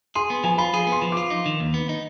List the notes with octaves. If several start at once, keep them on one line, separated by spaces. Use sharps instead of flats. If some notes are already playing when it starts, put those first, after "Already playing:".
G#4 C6
B3
F3 G#5
F4 B5
G#4
B3
C6
F3
F4 D6
D#4
D#3
D#2
B3
D#4